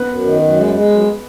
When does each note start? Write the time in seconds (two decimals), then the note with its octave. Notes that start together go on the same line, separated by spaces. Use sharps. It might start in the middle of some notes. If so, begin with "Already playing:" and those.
Already playing: B3 B4
0.08 F#2
0.24 D#3
0.42 F#2
0.58 G#3
0.74 G#3
0.90 F#2